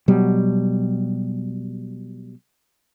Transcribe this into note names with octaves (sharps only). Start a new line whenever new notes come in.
B2 F#3 G3